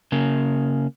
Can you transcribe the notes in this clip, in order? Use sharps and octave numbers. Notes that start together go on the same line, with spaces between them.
C#3 A#3